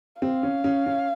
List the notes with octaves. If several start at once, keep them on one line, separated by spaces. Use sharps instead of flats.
C4 F5
C#4
C#4
C#4